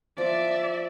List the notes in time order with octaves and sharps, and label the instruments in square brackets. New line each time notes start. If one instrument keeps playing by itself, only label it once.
[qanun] F3 [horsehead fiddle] D5 E5